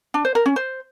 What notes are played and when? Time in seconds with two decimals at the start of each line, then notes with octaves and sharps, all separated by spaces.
0.14 D4
0.25 C5
0.35 A#4
0.46 C#4
0.56 C5